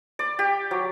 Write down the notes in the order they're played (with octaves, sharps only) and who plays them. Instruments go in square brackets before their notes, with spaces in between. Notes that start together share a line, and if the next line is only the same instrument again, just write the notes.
[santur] D5
G4
F#3